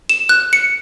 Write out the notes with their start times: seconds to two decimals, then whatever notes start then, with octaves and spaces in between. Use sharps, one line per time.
0.09 E7
0.29 F#6
0.53 C#7